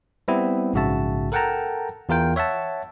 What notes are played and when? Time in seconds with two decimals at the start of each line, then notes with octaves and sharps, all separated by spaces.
0.28 G3 B3 C4 E4
0.73 A#1 G#2 C#3 F#4 E5 A5
1.32 A4 A#4 F#5 G5 A5 A#5
2.09 E2 F4 A#4 G5
2.36 C#5 E5 F#5 A5